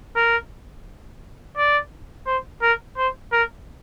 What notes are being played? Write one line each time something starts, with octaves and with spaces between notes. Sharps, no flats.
A#4
D5
C5
A#4
C5
A#4